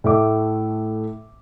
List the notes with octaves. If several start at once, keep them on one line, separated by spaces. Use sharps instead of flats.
A2 A3 E5 D6